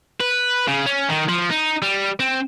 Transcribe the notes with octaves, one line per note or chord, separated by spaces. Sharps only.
B4
C#3
C#4
D#3
F3
D#4
G3
C4